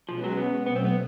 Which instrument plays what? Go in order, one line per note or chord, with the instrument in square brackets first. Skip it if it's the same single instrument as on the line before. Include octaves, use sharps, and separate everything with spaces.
[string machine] B2 G#3 C#4 F#4 B4 [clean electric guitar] F3
[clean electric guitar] F#3
B3
[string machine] B2 F#3 A3 [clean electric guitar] B3
[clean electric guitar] C4
B3